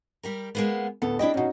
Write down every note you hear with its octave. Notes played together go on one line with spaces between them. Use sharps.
G3 G4 A#4
G#3 A#3 B3
D2 A2 B3 A4
D4 E4 G4 D#5 G5
G2 B2 C#4 D#4 F#4